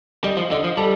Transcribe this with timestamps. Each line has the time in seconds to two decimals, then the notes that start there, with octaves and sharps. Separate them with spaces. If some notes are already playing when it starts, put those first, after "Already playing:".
0.24 G3 D#5
0.37 F3
0.51 D3 D#5
0.64 F3
0.77 G3 A4